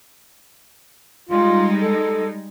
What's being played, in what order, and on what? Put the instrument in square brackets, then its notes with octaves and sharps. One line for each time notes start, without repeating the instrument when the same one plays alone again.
[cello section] G3 G#3 D#4 [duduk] F4
[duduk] A4